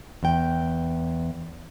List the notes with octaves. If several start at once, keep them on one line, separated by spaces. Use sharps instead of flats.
E2 G5